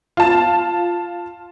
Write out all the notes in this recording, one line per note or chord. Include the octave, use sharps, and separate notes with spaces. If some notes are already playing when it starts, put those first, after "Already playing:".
F4 A5